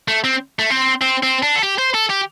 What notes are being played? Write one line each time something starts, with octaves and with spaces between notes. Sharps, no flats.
A3
C4
A3
C4
C4
C4
D4
A4
G4
C5
A4
G4